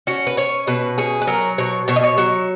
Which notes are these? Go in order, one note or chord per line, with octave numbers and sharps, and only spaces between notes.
C#4 F#4
B4
C#4 C#5
B2 B4
C#4 G#4
B4
F#3 A#4
B2 C#5
B2 C#5
D#5
C#5
F#3